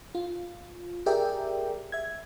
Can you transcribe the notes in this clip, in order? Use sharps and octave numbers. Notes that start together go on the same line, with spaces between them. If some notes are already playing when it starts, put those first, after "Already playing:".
F4
G4 G#4 A#4 D5 E5 G5
E5 G#6